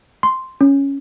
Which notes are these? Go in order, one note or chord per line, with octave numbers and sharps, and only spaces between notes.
C6
C#4